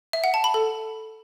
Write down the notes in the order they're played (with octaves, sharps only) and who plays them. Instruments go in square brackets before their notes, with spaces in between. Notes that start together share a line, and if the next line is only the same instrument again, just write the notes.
[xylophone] E5
F#5
A5
B5
A4